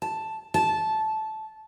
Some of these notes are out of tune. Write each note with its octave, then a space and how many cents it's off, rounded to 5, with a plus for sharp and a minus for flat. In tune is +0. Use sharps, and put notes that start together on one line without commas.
A5 +0
A5 -15